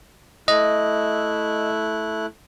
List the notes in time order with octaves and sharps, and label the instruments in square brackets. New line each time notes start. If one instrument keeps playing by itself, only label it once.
[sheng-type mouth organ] A3 E4 F#6 [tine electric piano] D#5